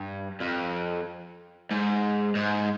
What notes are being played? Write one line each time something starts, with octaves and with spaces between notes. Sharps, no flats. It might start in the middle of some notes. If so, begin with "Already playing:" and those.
Already playing: G2
F2
G#2
G#2